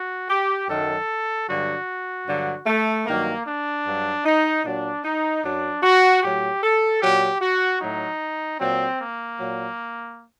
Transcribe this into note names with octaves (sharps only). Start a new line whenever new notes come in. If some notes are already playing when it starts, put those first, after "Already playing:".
Already playing: F#4
G4
F#2 D#3 F#3 A4
G2 D3 F#3 F#4
G2 D3 F#3
A3
G2 D#3 F#3 A#3
D4
G2 F#3
D#4
A#2 F#3 D4
D#4
F#2 F#3 D4
F#4
A2 F#3 G4
A4
A#2 F#3 G4
F#4
A2 F#3 D#4
A#2 F#3 C4
A#3
A#2 F#3